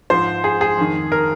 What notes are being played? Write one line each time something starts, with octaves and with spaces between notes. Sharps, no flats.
G#2 F3 C5
G#4
G#4
F2 D#3
A#4